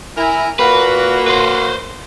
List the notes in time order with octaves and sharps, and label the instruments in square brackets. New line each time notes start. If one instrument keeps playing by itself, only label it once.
[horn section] E4 A#4 G#5
[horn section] A#2 A#3 F#4 [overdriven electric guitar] B4
[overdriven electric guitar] B4 C5